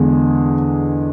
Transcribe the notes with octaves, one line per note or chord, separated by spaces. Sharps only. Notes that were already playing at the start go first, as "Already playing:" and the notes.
Already playing: E2 D3 G#3